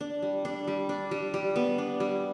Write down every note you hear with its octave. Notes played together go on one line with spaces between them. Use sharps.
D4
G3
D4
G3
D4
G3
G3
B3
D4
G3